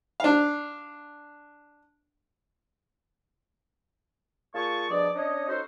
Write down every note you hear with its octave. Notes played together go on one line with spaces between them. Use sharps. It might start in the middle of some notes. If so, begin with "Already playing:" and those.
D4 F5
A#2 F4 G#4 A5 C#6
G2 B2 F3 G#4 D5
C#4 D4 C#5 D#5
C#4 D#4 F#4 A4 C5